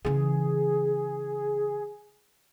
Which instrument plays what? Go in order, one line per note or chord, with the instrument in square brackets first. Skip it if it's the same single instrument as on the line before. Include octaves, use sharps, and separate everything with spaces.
[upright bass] C#3 E3 [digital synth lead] G#4